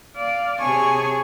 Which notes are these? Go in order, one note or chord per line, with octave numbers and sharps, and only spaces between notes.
D5 F5
C3 G#4 C#5 G#5 A5 C#6